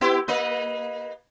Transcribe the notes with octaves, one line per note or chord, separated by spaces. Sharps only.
B3 E4 G4
A#3 B4 D#5